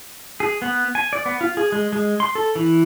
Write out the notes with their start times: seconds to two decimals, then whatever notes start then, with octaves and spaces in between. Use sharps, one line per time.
0.40 G#4
0.62 B3
0.95 G#5
1.13 D5
1.26 B3
1.41 F4
1.57 G#4
1.72 G#3
1.93 G#3
2.20 C6
2.35 A4
2.55 E3